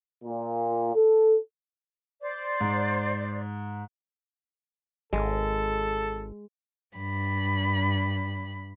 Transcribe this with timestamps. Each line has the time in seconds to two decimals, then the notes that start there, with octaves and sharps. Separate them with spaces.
0.24 A#2
0.94 A4
2.22 C5 D5 D6
2.61 G#2
5.13 G#1 G#3 A4
6.96 G2 B5